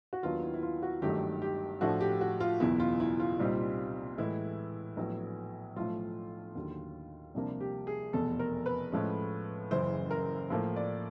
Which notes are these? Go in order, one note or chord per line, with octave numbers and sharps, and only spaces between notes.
F#4
D#2 D#3 F#3 B3 D4 F4
E4
E4
F4
F#4
G#1 G2 D#3 F#3 A3 G4
G4
A2 F3 A3 D4 F#4
G4
F#4
F4
F#1 E2 B2 E4
F4
E4
F4
C2 A#2 G3 C4 D#4
A2 E3 G#3 E4
A#1 A2 F#3 B3
B1 A2 F3 A3 F4
D#2 D3 F#3
C2 C3 F3 A#3 D4
G4
G#4
F1 E2 B2 A4
A#4
B4
A2 F3 G#3 C#4
F#1 F#2 C#3 E3 C5
A#4
A2 F3 A#3
D5